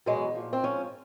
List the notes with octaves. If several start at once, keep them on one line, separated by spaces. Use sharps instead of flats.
E2 B2 F#3 G#3
A#2 F3
C4
G#2 F3 C#4